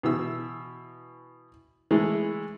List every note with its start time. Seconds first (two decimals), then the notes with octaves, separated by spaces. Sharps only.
0.03 B2 E3 E6
1.91 E3 G#3 A3